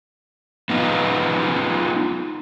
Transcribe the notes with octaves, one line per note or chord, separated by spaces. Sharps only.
B3 D#4 F4